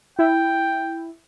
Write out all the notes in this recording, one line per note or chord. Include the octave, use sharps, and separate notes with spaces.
E4 G5